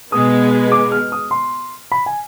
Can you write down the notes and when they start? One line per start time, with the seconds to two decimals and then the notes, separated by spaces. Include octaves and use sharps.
0.12 B2 G#3 B3 D#6
0.72 D6
0.92 F6
1.12 D#6
1.31 C6
1.92 B5
2.06 G#5